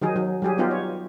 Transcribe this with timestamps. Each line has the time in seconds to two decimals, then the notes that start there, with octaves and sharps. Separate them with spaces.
0.02 D#3 F#3 D#4 G#4
0.16 F#3
0.42 F#3 G3 G4 G#4
0.58 B3 D#4 F4 G4
0.71 C#5